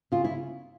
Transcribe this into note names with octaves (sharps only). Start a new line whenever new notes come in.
C#3 F4
E4
C#3